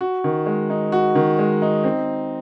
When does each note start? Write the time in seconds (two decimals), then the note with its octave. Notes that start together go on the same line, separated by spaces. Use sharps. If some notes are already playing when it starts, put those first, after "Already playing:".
0.01 F#4
0.24 D#3
0.46 G#3
0.70 D#4
0.92 F#4
1.15 D#3
1.39 G#3
1.62 D#4
1.84 C4